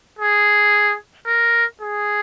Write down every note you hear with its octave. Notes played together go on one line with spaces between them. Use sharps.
G#4
A#4
G#4